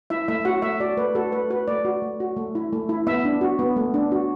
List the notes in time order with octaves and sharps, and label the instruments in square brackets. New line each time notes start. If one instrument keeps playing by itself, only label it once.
[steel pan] E4 E5
A3 E5
F#4 F#5
A3 E5
F#4 D5
A3 B4
F#4 A4
A3 B4
F#4 B4
A3 D5
F#4
A3
F#4
A3
E4
A3
E4
B3 E5
D4
F#4
B3
A3
D4
F#4